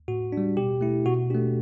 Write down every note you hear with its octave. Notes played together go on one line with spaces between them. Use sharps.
A2 F#4
G3 D4
B2 G4
A3 E4
B2 F#4
A3 D4 G4